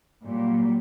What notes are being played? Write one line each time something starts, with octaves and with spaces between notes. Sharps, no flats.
A#2 F#3 G3